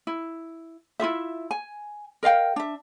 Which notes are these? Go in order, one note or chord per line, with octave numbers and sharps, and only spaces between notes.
E4
E4 F4 G#4 E5
G#5
A#4 D#5 F5 G5
D4 E5